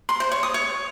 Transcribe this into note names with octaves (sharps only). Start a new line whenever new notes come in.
C6
C5
C#5
D#6
C#5